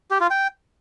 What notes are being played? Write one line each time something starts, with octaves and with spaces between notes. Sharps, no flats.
G4
F4
G5